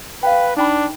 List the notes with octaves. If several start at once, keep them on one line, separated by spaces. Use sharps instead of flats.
B4 F5 G5
D4 D#4 G5 B5